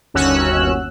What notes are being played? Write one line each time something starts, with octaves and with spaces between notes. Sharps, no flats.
G1 D#2 C#4 F#4 E6 F#6